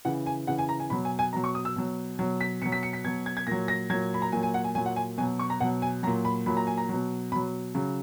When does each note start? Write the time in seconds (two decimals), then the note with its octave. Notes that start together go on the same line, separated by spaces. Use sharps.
0.05 C#3 E3 F#5
0.26 G#5
0.47 C#3 E3 F#5
0.59 G#5
0.69 A#5
0.80 G#5
0.90 B2 F#3 B5
1.05 G#5
1.19 G#5
1.33 B2 F#3 A#5
1.44 C#6
1.55 D#6
1.65 E6
1.76 B2 F#3
2.19 B2 F#3
2.41 B6
2.62 B2 F#3 C#7
2.72 B6
2.83 C#7
2.93 B6
3.04 B2 F#3 G#6
3.26 G#6
3.37 G#6
3.47 A#2 F#3 A#6
3.68 A#6
3.90 F#3 G#6
3.94 A#2
4.14 B5
4.22 A#5
4.32 A#2 F#3 G#5
4.43 G#5
4.54 F#5
4.64 G#5
4.75 A#2 F#3 G#5
4.86 F#5
4.96 G#5
5.18 B2 F#3 G#5
5.39 C#6
5.50 A#5
5.60 B2 F#3 F#5
5.82 G#5
6.03 F#3 A#5
6.07 A#2
6.25 B5
6.46 A#2 F#3 B5
6.57 A#5
6.67 G#5
6.78 A#5
6.89 B2 F#3
7.32 B2 B5
7.36 F#3
7.75 C#3 F#3